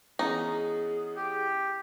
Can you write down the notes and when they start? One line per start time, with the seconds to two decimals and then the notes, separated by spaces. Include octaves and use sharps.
0.19 E3 B3 C#4 D#4 G#4
1.17 G4